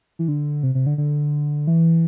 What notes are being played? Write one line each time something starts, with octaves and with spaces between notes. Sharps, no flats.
E3
D3
C3
C3
D3
D3
E3